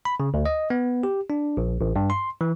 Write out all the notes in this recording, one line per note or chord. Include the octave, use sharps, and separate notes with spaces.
B5
C#3
D2
D#5
B3
G4
D4
A#1
A1
G2
C6
E3